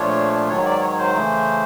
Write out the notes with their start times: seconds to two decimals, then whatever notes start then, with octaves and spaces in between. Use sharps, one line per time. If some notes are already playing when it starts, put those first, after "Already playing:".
Already playing: A#2 F3 A3 D4 F4 C#5
0.49 G#2 D#3 F#3 C#5
0.66 D5
0.81 C#5
0.98 C5
1.14 C#3 E3 A3